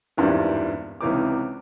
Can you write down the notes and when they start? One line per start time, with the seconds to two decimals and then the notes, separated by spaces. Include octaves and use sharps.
0.17 G#1 E2 G2 A#2 E3 G3
1.01 C#2 C3 E3 C#4 D#4 D6